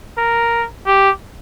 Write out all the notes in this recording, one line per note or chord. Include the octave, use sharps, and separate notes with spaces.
A#4
G4